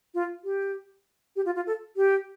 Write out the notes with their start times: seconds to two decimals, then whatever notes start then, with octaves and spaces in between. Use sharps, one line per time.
0.14 F4
0.44 G4
1.36 G4
1.45 F4
1.56 F4
1.67 A4
1.97 G4